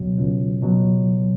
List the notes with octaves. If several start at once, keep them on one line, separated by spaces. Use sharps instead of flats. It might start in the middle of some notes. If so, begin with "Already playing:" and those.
Already playing: C#2 B2 F#3
C#2
B2 F#3